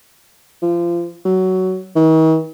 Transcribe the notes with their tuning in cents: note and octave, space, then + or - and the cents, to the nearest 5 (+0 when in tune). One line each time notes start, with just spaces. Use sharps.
F3 -25
F#3 +15
D#3 +45